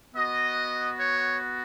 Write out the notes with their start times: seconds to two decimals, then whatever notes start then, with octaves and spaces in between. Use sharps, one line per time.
0.15 B3 F#4 D#5
0.99 C#5